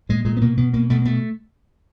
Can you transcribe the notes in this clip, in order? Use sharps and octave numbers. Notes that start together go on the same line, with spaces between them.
A#2 G#3
A#2 G#3
B3
B2 A#3
B2 B3
B2 A#3
B2 A3
A#3
B2 A3